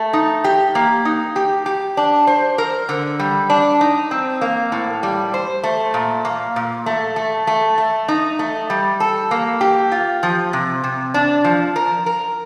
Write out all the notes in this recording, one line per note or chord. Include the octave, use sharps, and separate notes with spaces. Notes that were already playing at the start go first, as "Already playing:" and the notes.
Already playing: A3
D#4
G4
A#3
D#4
G4
G4
D4
C5
A#4
D3
G3
D4
D#4
C4
A#3
A2
G3
C5
A3
A#2
A#3
A#2
A3
A3
A3
A3
D#4
A3
G3
A4
A#3
G4
F4
F3
C3
C3
D4
F3
A#4
A#4